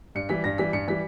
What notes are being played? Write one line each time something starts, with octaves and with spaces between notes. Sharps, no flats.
G2 C#7
E3 G3 B6
G2 A#6
E3 G3 B6
G2 C#7
E3 G3 B6